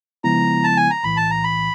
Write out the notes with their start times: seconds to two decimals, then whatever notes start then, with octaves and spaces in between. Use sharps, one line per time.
0.24 C#3 F3 G#3 B3 E4 A#5
0.64 A5
0.77 G#5
0.90 A#5
1.04 B1 A2 E3 B5
1.17 A5
1.31 A#5
1.44 B5